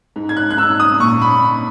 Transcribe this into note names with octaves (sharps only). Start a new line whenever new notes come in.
G#2
G#6
F#6
F#6
G#2 E6
D#6
A#2 C#6
B5